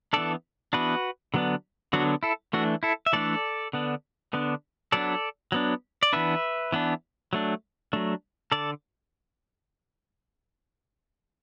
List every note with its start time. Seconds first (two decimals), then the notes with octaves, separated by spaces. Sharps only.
0.13 E3 B3 D4 A4 D5
0.73 E3 B3 D4 F#4 B4
1.34 D3 F#3 B3 D4
1.93 D3 F#3 B3 D4 F#4
2.23 E4 A4
2.53 E3 A3 D4 F#4
2.83 E4 A4
3.06 E5
3.13 E3 A3 D4 A4 D5
3.73 D3 B3 D4
4.33 D3 B3 D4
4.92 F#3 B3 D4 A4 D5
5.52 F#3 B3 D4
6.03 D5
6.13 E3 B3 D4 B4 E5
6.72 E3 B3 D4
7.33 F#3 A3 D4
7.93 F#3 A3 D4
8.52 D3 A4 D5